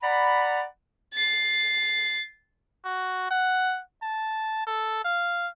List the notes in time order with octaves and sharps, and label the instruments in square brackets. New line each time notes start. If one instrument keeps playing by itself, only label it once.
[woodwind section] D5 F#5 A#5 B5
[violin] A6 C7
[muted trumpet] F#4
F#5
A5
A4
F5